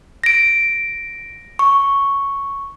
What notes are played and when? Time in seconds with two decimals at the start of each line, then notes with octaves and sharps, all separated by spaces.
0.24 A#6 D7
1.59 C#6